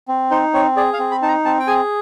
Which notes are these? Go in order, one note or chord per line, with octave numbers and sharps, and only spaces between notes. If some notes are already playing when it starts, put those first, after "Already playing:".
C4
D#4 C5
C4 C#5
G#4 D5
F5
C4
B5
D#4 A5
A#5
C4 A5
G5
G#4 G#5